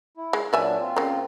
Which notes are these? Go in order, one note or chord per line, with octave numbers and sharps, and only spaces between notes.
E4
G#3
A#2 F#3 D4 D5 E5 G#5
C4 F4
C#3 A#3